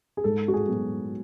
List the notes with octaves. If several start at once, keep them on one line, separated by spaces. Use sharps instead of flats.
G#4
G#2 A4
F#4
G#4
F#3 B3